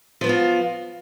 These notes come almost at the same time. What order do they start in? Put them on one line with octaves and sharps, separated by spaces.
F3 B3 F#4 F4